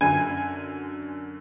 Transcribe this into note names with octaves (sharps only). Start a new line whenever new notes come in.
F#2 D3 G#5